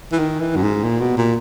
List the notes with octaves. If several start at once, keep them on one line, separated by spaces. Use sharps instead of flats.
E3
D#3
E3
F#2
G#2
A#2
B2
A#2